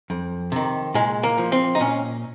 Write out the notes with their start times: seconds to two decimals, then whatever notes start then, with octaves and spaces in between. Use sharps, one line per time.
0.10 F2
0.52 C3 D#3
0.94 A#2 G#3
1.23 A#3
1.38 F3
1.52 C4
1.75 D#4
1.80 A#2 C#4